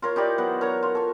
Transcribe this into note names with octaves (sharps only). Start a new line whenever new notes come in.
F4 A#4 C#5
D#4 E4 G4 D5
F#3 B3 F#5
A#4 C#5 A#5 C#6
F4
A4 C#6